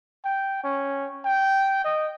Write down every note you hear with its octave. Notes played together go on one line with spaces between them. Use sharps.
G5
C#4
G5
D#5